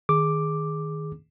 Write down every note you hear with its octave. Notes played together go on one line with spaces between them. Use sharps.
D#3 G#4 D6